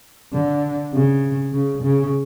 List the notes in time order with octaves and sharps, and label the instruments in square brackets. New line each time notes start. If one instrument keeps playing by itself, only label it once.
[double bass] D3
C#3
C#3
C#3